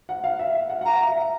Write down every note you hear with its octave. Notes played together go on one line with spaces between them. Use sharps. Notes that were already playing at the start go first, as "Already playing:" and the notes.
F#5
F5
E5
F5
F#5
F#5
F5 A#5
E5
F5
E5